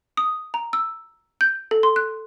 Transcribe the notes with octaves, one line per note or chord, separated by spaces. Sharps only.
D#6
A#5
E6
G6
A4
C6
F#6